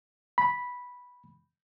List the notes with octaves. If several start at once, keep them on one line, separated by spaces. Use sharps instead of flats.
B5